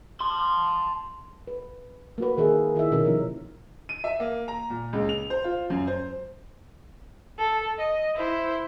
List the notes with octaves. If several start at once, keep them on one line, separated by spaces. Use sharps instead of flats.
A5 C6
B4
A#3 F#4 B4
D#3 G#4 A#4 E5
D#3 E4 G#4 E5
B2 D#3 C#4 A#4
C3 F3 C#4
D#7
E5
A#3
A#5
A#2
C#2
F7
C5
F4
F#2
C5
A4
D#5
E4 C5